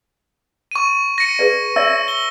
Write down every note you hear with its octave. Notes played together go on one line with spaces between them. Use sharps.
C#6 D#7
A#6 C#7 D#7
G#4 B4 D5
C#5 D5 E5 E6
G7